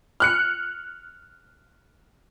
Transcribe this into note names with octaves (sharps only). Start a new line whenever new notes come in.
F6 F#6 C#7